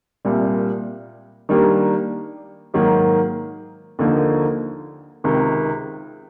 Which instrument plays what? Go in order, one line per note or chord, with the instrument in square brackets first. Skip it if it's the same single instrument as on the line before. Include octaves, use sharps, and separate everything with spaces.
[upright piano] C2 A#2 G3
D#3 G3 A#3 D4 G4
G#2 D#3 F#3 A#3
D#2 D3 F3 A#3 D#4
C#2 C3 D#3